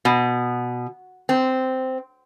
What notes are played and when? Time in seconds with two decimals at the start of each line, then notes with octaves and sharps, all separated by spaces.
0.05 B2
1.29 C4